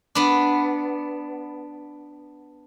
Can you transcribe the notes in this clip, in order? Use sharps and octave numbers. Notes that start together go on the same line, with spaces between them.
B3 D4